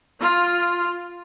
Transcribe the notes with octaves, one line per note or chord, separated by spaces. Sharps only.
F4